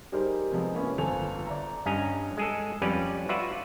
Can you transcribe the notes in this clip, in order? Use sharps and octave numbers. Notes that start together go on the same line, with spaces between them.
G3 D#4 G4 G#4 A#4 C5
C3 F3 G#3 B3
A#3 B3 C#4 E4 B4
G1 F2 A4 G#5 F7
D5 E5 A#5
G2 C#4 D#5 G#5 A#5
G#3 G#4 A4
F2 G3 C#4 B4 D5
F4 F#4 B4 D5 E5